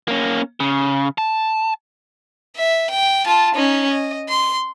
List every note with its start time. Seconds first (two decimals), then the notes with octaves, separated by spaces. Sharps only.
0.08 A#3 C#4
0.60 C#3
1.18 A5
2.57 E5
2.91 G5
3.26 F4 A5
3.55 C#4 D#4
3.90 D#5
4.29 C6